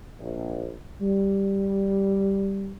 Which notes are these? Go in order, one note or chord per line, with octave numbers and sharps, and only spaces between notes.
A#1
G3